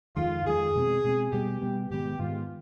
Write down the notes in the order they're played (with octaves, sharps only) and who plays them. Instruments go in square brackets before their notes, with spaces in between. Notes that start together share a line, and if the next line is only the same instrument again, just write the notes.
[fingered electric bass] F2 D#3 G#3 [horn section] F4
[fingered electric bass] F2 D#3 G#3 [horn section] G#4
[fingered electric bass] B2 G#3 C4
B2 G#3 C4
[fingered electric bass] B2 G3 B3 [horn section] G4
[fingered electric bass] B2 G3 B3
[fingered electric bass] G#2 D#3 G#3 B3 [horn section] G4
[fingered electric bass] G#2 D#3 G#3 B3 [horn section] F4